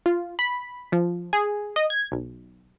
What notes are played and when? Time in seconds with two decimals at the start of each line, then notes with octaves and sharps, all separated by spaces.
0.06 F4
0.39 B5
0.92 F3
1.33 G#4
1.76 D#5
1.90 G#6
2.12 B1